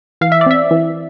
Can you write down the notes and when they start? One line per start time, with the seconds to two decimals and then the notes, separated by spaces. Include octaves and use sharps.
0.21 E3 F5
0.32 E5
0.41 D5
0.46 C4 E5
0.71 E3